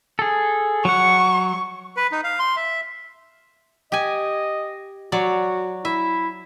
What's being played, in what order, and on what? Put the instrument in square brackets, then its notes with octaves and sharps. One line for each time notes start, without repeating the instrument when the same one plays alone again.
[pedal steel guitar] G#4 A4
[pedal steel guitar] F#3 F#5 [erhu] C#6
[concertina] B4
D#4
F5
C6
E5
[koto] G4 G#5 [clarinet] D#5
[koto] F#3 C#5 D5 [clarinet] F#4
[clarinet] E4 [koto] E5